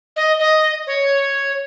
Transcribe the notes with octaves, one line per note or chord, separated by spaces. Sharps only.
D#5
D#5
C#5